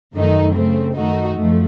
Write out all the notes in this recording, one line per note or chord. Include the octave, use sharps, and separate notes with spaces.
F#2 D#3 A3 D#4
C#3 A3 C4
F#2 D#3 A3 D#4 F#4
F#2 F3 A3